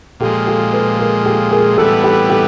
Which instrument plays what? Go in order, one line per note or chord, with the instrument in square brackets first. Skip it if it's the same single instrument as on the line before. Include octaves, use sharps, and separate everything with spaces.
[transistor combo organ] A#2 F3 G#3 [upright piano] G4 A4
[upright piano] G4 A4
A4 B4
G#4 A#4
G4 A4
G#4 A#4
[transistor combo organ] A2 E3 G3 B3 [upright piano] G4 A4
[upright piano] G4 A4
G4 A4